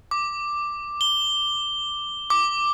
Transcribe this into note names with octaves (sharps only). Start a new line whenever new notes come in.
D6
G7
D6